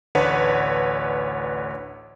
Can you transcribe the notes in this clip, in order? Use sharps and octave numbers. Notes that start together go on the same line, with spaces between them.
A1 D2 D4 B4 C#5 F#5